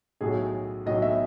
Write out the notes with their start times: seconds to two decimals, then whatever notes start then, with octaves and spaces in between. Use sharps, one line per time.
0.21 B1 A2 F#3 G#4
0.86 B1 A2 F#3 D#5
1.02 E5